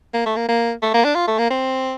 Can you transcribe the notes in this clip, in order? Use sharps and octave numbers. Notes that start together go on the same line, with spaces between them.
A#3
A3
A#3
A#3
A3
A#3
D4
F4
A3
A#3
C4